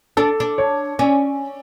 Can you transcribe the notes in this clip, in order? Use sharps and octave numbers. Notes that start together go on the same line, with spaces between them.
D4 A4
D4
C#5
C#4 D5